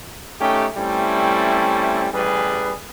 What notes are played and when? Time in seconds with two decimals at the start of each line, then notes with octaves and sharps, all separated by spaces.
0.41 A3 C#4 D#4 G4
0.77 G3 A3 C4 C#4 E4
2.14 A1 G3 G#4 B4